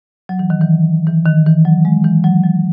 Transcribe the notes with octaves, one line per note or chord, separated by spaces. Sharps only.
F#3
E3
D#3
E3
E3
D#3
E3
F#3
G#3
E3
F#3
F#3